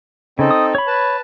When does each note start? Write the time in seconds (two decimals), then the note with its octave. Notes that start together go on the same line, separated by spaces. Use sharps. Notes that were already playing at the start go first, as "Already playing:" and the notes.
0.39 C#3 C4 D#4 A4
0.51 D#6
0.75 C#5 B5
0.87 B4 A5